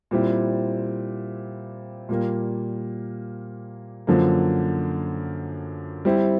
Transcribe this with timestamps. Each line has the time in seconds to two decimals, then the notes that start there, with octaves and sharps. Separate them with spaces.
0.11 A#2 G3 C4 E4
2.09 A#2 G3 A#3
4.07 F#2 D3 F3 A#3
6.05 G3 C4 E4